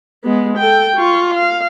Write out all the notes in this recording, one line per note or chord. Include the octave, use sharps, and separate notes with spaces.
G#3 B3
A4 G5
F4 C#6
F5